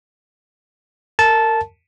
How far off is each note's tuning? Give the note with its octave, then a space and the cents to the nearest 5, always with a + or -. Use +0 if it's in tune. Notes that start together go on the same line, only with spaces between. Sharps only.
A#4 -25 A5 -10